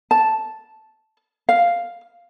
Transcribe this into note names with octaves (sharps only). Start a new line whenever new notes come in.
A5
F5